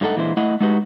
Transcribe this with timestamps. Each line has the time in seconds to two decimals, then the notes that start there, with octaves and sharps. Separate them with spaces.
0.01 G2 F#3 A3 D#4 A4 F#5
0.16 A#2 E3 G#3 D4 E4 C5
0.37 A3 E4 D#5 F#5
0.61 G#3 D#4 F#4 G4 B4